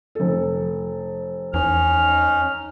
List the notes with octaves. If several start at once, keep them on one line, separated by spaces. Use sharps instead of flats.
F1 A4
E2 C#4 D#4 F6